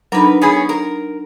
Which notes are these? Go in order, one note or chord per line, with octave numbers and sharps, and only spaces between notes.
F#3 D4 D#4 A#4 B4
B3 C#4 G#4
A#4